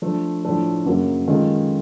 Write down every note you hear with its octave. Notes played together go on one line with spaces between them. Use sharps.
F3 A3 D4
A2 F3 A3 D4
F#2 C#3 F#3 A#3
D#3 G#3 C#4 F4 A4